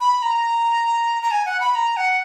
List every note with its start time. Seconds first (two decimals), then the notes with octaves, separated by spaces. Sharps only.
0.01 B5
0.22 A#5
1.23 A#5
1.31 G#5
1.46 F#5
1.60 B5
1.75 A#5
1.97 F#5